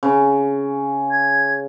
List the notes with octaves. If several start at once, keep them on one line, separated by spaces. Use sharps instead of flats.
C#3
G#6